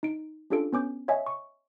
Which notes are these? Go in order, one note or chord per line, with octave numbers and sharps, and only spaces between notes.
D#4 D7
C#4 D4 F4 G4 A4 D7
B3 C#4 D6 G6
C#5 D#5 E5 G#5
C#6